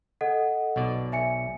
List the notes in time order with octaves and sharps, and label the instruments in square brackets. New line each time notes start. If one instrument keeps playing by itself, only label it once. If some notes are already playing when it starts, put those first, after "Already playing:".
[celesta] A4 D#5 F#5
[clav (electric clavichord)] B1 B2 D5
[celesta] E5 G#5 C#7